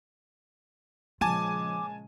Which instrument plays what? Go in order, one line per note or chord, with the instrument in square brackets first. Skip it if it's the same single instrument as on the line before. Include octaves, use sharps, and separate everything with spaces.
[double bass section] A#1 C#3 G#3 [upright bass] F3 [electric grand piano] G#5 A5 D#7 [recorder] D6